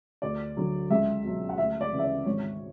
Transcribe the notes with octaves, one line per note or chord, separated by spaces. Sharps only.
D2 D5
D3 F#3
C#2 E5
B2 F#3
F#5
D2 E5
D5
C#3 E3
E5
D5
G#1 C#5